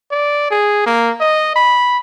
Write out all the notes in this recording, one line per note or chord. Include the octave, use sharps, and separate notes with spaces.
D5
G#4
A#3
D#5
B5